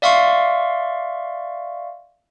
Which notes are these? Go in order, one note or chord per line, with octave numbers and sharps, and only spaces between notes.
D5 E5 F5 C6 C#6